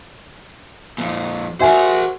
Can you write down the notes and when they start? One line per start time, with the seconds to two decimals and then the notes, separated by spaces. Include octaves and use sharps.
0.98 F2 A#2
1.60 F#4 A#4 C5 E5 G#5